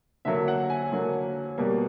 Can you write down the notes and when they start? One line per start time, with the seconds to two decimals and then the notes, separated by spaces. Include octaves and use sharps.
0.25 D3 F#3 A#3 E5
0.48 F#5
0.70 G#5
0.92 D3 F#3 A#3
1.58 B2 G3 A#3